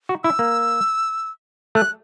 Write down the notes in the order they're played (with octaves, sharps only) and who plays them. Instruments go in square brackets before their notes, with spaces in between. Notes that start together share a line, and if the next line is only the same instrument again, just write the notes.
[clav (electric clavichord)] F#4
[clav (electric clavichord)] E4 [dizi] E6
[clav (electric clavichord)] A#3
[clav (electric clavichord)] A3 [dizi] F#6